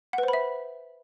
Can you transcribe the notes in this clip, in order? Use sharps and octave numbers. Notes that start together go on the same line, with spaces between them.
F#5
B4
C5
B5
E5